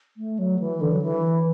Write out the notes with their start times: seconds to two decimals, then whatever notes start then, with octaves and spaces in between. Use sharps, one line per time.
0.17 A3
0.39 F#3
0.59 E3
0.81 D3
0.92 F#3
1.02 E3